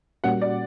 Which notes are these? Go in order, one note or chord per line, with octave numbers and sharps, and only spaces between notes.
A#2 G3 A#3 C#4 F#4 F#5
D5